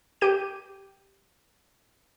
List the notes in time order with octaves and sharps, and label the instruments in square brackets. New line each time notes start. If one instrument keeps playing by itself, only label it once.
[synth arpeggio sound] G4 G6 D#7